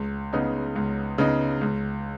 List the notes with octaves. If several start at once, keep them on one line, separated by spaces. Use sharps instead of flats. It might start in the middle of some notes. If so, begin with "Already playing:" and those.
Already playing: C#2
C#3 B3 D#4
C#2
C#3 B3 D#4
C#2